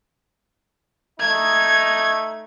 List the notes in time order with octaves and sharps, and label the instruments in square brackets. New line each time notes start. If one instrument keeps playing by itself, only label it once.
[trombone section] A3 D#4 [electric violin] G#6